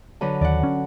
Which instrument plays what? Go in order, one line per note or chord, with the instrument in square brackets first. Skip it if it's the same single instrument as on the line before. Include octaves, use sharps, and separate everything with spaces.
[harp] D3 F#3 B4
[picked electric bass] D#2 [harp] D5 F#5
[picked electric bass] C#4